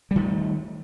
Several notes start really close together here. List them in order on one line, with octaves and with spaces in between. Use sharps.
G3 D#3 A3